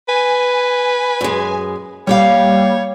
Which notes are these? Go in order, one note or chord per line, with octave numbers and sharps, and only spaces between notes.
B4 G#5
F#2 G#3
G3 A#3 G4 C#5 F5